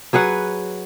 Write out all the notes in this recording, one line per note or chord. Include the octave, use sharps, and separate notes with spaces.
F#3 G#4 B4 F#5